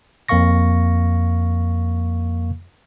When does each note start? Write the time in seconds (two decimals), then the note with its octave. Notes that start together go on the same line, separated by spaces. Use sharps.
0.28 F2 A#3 A#4 F5 C#6 A#6